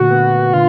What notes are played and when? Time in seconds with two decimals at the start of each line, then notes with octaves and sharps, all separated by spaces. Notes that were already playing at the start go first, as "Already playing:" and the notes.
Already playing: A#2 D3 A3 F#4
0.10 B3
0.53 D3 F4